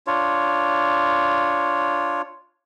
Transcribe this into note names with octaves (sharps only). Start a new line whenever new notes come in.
D4 F4 C#5